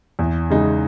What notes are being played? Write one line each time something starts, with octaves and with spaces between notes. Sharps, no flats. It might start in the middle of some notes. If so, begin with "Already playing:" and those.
E2
C#3 G#3 D#4 G#4